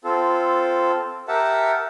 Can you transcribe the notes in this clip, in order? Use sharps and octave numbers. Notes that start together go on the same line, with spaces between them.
C4 F4 A4
G4 A#4 E5 F#5 A5